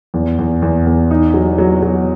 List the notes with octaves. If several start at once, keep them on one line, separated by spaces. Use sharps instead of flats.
E2
E2
E2
E2
D#4
F#3
F#3
F#3